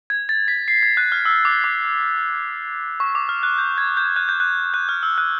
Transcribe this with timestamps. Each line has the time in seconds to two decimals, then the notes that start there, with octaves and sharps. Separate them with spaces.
0.10 G#6
0.29 A6
0.48 B6
0.68 C7
0.83 G#6
0.97 F#6
1.12 F6
1.25 E6
1.45 D6
1.64 D6
3.00 C#6
3.15 D6
3.29 F6
3.43 F#6
3.58 G6
3.78 G#6
3.97 G6
4.16 F#6
4.29 G6
4.40 F#6
4.74 F#6
4.89 F6
5.03 E6
5.18 F#6